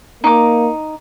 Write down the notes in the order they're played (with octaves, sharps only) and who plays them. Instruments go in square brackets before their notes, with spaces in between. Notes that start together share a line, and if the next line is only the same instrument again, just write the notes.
[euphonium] A#3 [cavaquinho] D#4 D6